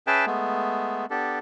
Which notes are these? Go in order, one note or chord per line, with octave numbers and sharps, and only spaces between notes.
C#4 G#4 B4 E5 G5 A5
G#3 A3 B3
B3 D4 G4 A4